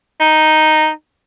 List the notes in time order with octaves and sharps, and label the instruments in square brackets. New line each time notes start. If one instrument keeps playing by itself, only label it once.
[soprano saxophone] D#4